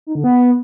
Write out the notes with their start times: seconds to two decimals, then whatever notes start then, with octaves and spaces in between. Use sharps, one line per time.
0.07 D#4
0.15 D3
0.24 B3